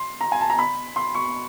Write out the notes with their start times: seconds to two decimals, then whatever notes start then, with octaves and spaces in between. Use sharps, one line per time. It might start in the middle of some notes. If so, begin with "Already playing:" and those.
Already playing: C6
0.21 A#5
0.32 G#5
0.41 A5
0.50 A#5
0.58 B5
0.96 C6
1.15 C#6